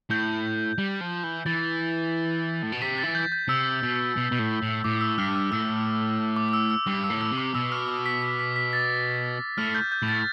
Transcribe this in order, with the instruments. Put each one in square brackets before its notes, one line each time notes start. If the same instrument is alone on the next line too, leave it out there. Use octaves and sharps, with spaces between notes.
[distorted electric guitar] A2 [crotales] G6
[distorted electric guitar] G3
F3
E3
[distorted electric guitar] E3 [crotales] A6
[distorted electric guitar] A2
B2
[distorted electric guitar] C3 [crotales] B6
[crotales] A6
[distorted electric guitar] E3
[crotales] G6
G6
[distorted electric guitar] C3 [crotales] E6
[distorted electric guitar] B2
B2
B2
A2
A2
[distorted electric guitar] A2 [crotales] D6
[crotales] E6
[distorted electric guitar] G2 [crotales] F6
[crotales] E6
[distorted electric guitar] A2 [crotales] E6
[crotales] D6
D6
E6
E6
[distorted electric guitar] G2 [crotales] D6
[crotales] E6
[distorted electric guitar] A2
[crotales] E6
[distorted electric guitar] C3
[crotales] D6
[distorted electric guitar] B2 [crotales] E6
[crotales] F6
D6
B6
B6
B6
B6
A6
[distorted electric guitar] A2 [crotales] F6
[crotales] G6
G6
[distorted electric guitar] A2
[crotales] A6